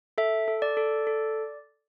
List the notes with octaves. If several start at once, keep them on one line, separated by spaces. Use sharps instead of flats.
A4 E5
A4
D5
A4
A4